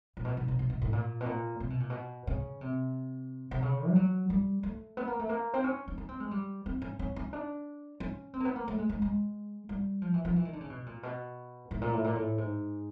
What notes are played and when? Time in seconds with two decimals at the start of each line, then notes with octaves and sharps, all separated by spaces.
0.17 A#2
0.25 B2
0.37 B2
0.48 B2
0.59 B2
0.70 B2
0.82 A2
0.93 A#2
1.20 B2
1.26 A#2
1.60 C3
1.70 B2
1.80 A#2
1.90 B2
2.27 C#3
2.61 C3
3.51 C3
3.62 C#3
3.89 G3
3.95 F#3
4.30 G3
4.63 A3
4.97 B3
5.07 A#3
5.19 A3
5.29 A#3
5.54 C4
5.64 C#4
5.88 D4
5.98 C#4
6.09 C4
6.20 G#3
6.31 G3
6.66 C4
6.82 C#4
6.99 C#4
7.16 C#4
7.33 D4
8.00 C#4
8.34 C4
8.40 A#3
8.45 B3
8.56 A#3
8.68 A3
8.78 G#3
8.89 G#3
9.02 G#3
9.69 G3
10.02 F3
10.14 E3
10.25 F3
10.36 E3
10.45 D#3
10.53 D3
10.61 C#3
10.70 B2
10.86 A#2
11.03 B2
11.71 A2
11.81 A#2
11.93 A2
12.04 A#2
12.15 A2
12.38 G#2